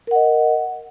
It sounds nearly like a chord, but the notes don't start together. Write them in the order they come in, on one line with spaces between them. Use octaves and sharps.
A#4 F#5 D#5